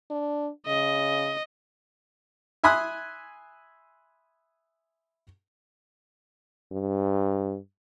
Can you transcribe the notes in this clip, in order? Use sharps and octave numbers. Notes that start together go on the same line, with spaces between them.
D4
C#3 D#5
E5 G#5 B5 C6 D#6 F#6
G2